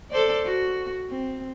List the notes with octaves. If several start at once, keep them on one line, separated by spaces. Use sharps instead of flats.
A4 C5 D5
F#4
C4